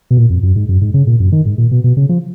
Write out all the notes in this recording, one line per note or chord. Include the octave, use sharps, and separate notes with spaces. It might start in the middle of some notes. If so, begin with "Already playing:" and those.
B2
A#2
F2
F#2
G#2
F#2
G#2
C#3
A#2
F#2
D#3
G#2
A#2
B2
B2
C#3
F3